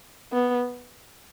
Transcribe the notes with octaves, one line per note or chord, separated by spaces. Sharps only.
B3